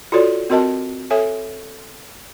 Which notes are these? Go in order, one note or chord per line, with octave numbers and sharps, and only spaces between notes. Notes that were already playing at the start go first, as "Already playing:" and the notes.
F4 F#4 A4 C#5 D5
C4 F#4 A#4 D#5 A5
A4 C#5 E5 G#5